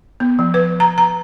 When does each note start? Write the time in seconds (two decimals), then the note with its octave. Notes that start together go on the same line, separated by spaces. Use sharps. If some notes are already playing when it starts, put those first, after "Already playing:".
0.20 B3
0.39 F3
0.54 B4
0.80 A#5
0.98 A#5